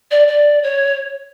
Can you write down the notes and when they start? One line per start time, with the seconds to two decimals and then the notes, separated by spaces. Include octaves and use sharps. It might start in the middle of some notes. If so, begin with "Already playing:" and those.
0.11 D5
0.28 D5
0.63 C#5